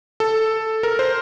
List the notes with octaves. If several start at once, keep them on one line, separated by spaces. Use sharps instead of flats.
A4
A#4
C5